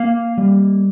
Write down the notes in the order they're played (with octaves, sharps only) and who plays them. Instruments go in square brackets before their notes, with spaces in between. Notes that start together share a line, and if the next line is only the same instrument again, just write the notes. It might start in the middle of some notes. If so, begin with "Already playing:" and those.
Already playing: [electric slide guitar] A#3 F5
G3